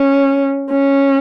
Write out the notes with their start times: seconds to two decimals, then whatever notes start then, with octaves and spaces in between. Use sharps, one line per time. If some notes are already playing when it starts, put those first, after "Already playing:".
Already playing: C#4
0.70 C#4